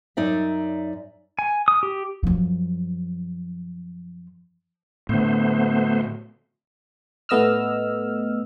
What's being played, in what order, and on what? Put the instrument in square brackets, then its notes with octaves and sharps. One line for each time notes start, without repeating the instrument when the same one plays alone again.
[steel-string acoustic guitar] F#2 D#4 D5 E5
[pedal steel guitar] G#5
D#6
G4
[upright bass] F#2 F3
[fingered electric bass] A2 D3 [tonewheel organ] A3 B3 C5
[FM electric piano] A2 A3 B3 D#5 E6 F6